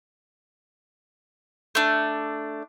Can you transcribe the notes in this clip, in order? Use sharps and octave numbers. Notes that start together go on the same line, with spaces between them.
A3 D4